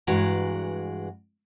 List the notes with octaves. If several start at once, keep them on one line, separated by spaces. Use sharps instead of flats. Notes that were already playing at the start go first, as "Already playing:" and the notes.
G2 E3 G#3 F#4 D5 A#5